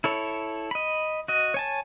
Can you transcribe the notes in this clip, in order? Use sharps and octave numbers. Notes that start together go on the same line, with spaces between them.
E4 A4 C#5
D#5 B5
F#4 D#5
C#5 G#5 A5